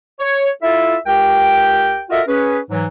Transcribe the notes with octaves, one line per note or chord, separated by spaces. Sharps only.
C#5
E4 F4 A4 E5
C#2 G4 A#4 G5
F4 F#4 A4 A#4 D#5 E5
C#4 G#4 B4
G#2 E3 F#3